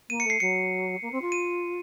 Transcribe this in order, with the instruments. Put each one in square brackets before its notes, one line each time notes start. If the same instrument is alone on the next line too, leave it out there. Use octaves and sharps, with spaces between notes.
[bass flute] A#3 [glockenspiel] D#7
[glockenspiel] C#7
[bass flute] A3 [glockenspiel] C7
[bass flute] F#3 [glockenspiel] C#7
[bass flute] A#3
C4
F4
[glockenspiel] D#7